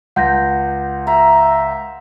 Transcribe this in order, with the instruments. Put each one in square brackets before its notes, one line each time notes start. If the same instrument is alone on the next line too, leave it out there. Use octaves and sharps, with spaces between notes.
[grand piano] C#2 [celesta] F#5 G6 A#6
[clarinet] E5 [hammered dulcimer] A#5